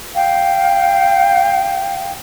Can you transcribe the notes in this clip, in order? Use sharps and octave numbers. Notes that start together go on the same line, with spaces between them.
F5 G5